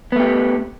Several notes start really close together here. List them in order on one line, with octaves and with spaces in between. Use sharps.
B3 A3 G4